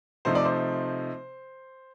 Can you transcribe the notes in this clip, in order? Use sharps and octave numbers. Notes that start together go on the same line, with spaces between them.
C3 F3 A3 D#4 C5
D5
C5